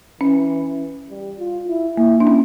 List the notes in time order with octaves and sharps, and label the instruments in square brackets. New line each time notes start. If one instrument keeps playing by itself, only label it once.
[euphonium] E3 [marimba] C#4
[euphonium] G3
F4
E4
[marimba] A#3 [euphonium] E4
[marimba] D4
C#4